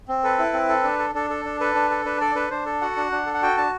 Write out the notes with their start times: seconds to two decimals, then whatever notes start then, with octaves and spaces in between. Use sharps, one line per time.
0.08 C4
0.24 A4 B4
0.39 E4
0.53 C4
0.69 A4
0.84 D4
0.99 A4
1.14 D4 A4
1.30 A4
1.45 D4
1.60 A4 B4
1.75 D4
1.90 A4
2.05 D4 B4
2.21 A4 D5
2.35 D4 B4
2.50 D4 C5
2.66 A4
2.81 F#4 F#5
2.97 D4
3.11 D4
3.26 A4
3.34 F#5
3.42 F#4 G5
3.57 D4 A5